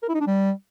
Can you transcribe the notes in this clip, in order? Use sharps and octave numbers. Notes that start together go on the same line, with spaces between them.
A#4
E4
D#4
D4
G3